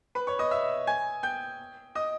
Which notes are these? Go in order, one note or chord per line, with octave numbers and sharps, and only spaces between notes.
B4 B5
C#5 C#6
D#5 D#6
E5 E6
G#5 G#6
G5 G6
D#5 D#6